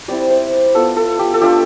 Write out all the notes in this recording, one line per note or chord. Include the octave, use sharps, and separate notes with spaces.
G3 C4 E4 D5
C5
B3 F4 A4
A4
G4
A4
A3 D4 F4 G4